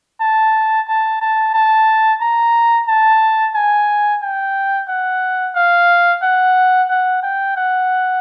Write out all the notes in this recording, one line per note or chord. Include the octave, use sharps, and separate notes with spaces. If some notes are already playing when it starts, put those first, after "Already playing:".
A5
A5
A5
A5
A#5
A5
G#5
G5
F#5
F5
F#5
F#5
G5
F#5